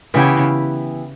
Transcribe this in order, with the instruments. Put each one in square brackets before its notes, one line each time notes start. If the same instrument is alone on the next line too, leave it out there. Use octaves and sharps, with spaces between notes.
[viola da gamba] C#3 [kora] E3 B3 E4 G4